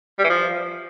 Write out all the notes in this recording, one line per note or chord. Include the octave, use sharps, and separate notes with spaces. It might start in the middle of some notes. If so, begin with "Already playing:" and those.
G3
E3
F3